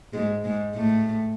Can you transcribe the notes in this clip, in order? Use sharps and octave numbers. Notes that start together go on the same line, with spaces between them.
G#2 G#3
G#2 G#3
A2 A3